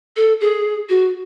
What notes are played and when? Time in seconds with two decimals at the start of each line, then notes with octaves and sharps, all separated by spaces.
0.16 A4
0.41 G#4
0.89 F#4